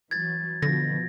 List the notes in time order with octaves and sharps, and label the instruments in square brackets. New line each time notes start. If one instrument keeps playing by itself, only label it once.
[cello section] E3 F#3 [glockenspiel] G#6 A6
[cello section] B2 F3 [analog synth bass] D3 [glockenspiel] A#6